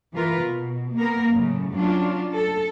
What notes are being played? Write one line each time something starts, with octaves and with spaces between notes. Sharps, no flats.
E3 F4 A#4 B4
B2
A#3 B3 A#4
F#2 A2 C#3
F#3 C#4 D4 F4
A4